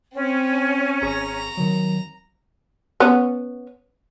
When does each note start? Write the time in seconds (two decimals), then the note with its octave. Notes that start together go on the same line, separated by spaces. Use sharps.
0.14 C4 C#4
1.02 G#1 G#4 A#5 C#6
1.57 D#3 F#3
3.00 B3 C#4